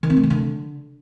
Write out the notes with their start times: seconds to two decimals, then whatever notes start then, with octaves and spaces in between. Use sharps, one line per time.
0.03 D#3
0.10 C4
0.17 A3
0.23 D#3
0.30 D3